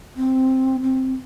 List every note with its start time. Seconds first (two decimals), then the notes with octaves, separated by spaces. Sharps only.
0.16 C4
0.83 C4